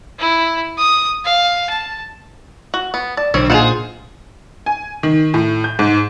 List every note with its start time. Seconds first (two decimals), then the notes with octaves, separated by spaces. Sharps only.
0.19 E4
0.78 D#6
1.25 F5
1.70 A5
2.74 F#4
2.94 B3
3.17 D5 A5
3.34 B1 D3 C4 C#5
3.50 A#2 D#4 F4 G#4 C5 F#5
4.66 G#5
5.03 D#3
5.34 A2
5.64 G6
5.79 G#2